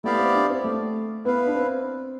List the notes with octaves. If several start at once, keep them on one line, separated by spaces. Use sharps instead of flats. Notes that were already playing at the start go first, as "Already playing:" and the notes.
A3 B3 E4 G4 D5 F5
C4
D4
C4
A3
B3 E4 B4 F5
D4
C4